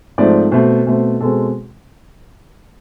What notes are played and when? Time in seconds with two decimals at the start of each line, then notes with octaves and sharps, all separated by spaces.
0.18 G#2 F3 A3 C4 D5
0.52 B2 A3 C4 C5
0.87 B2 A3 C4
1.20 B2 G#3 C4 A4